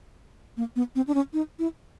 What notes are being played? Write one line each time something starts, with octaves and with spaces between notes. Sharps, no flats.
A#3
B3
C4
D4
C#4
D#4
E4